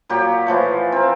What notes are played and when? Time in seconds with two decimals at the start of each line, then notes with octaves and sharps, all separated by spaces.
0.09 A#2 F#3 G4
0.47 E3 F3 A3
0.92 C4 A#4